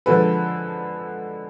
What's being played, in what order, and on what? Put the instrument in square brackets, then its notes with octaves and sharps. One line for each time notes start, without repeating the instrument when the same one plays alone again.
[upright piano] D3 F3 G#3 A4 B4